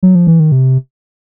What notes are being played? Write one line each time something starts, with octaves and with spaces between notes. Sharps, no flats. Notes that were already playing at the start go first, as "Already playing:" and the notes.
F#3
F3
E3
D#3
C3